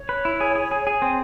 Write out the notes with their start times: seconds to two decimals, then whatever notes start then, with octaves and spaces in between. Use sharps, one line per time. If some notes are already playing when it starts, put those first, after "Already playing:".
Already playing: C#5
0.09 B4
0.25 E4
0.40 G#4
0.55 G#4
0.71 G#4
0.87 G#4
1.02 C4